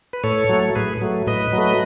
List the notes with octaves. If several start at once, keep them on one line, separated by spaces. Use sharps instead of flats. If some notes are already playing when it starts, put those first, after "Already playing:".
B4
A2 A4 C#5
F#3 A3
A2 G#4 B4
F#3 A3
A2 B4 D#5
F#3
A3